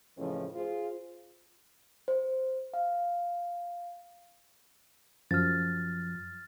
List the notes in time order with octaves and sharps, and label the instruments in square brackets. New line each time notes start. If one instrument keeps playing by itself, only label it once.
[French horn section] F2 A2 C#3 E3 F3 C#4
F4 G#4 C5
[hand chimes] C5
F5
[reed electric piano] F#2 F3 [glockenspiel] F6 A6